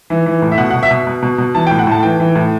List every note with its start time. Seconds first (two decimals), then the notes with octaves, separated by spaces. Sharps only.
0.10 E3
0.26 E3
0.42 A2
0.52 E5
0.58 B2 F#5
0.70 F#5
0.74 B2
0.83 E5
0.91 B2
1.07 B2
1.22 B2
1.38 B2
1.55 E3 A5
1.67 G5
1.71 A2
1.79 F#5
1.87 A2 A5
2.03 E3 G5
2.20 E3
2.35 A2